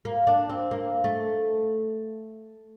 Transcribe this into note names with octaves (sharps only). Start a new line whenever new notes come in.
A#3
D4
C4
A#3
A3